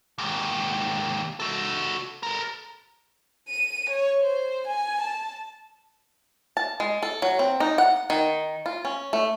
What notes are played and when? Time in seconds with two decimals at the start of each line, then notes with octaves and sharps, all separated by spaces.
0.18 D#2 G#2
1.40 F#4 A4
2.23 A4 A#4
3.48 D#7
3.90 C#5
4.21 C5
4.67 G#5
5.01 A5
6.57 A5
6.80 G#3
7.03 A4
7.22 F#3
7.39 C4
7.60 D#4
7.78 F#5
8.10 D#3
8.66 F4
8.85 C#4
9.13 A3